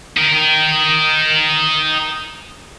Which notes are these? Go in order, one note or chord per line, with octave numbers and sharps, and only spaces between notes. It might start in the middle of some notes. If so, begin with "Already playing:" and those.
D#4 A#4